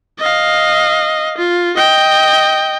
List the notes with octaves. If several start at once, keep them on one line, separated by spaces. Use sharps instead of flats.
D#5 F5
F4
D#5 G5